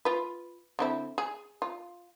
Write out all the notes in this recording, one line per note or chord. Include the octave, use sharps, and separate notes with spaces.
F4 B4
D3 C4 E4
G#4
F4